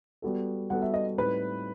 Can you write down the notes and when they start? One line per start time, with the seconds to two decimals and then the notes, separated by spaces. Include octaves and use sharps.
0.22 G3 B3 F#4 A4
0.70 G3 B3 F#4 A4 F#5
0.82 E5
0.94 D#5
1.17 A2 G3 C4 D#4 B4